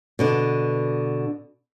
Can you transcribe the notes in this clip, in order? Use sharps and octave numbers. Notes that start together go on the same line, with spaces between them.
B2 D3 D4